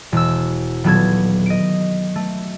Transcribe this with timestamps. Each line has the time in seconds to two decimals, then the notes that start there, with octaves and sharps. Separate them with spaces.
0.12 E1 E6
0.84 D#1 F#3 B3 A4 G#6
1.46 D#5 D7
2.16 A3